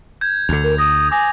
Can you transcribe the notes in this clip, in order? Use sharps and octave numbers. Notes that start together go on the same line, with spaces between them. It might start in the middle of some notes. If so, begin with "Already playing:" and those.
G6 G#6
D2 D3 F7
A#4
D#6 A#6
G#5 D6 D#6 A#6